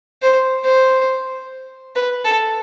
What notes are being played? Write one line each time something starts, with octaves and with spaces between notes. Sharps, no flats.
C5
C5
B4
A4